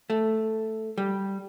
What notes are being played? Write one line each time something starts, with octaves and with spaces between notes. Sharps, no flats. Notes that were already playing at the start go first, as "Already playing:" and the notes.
A3
G3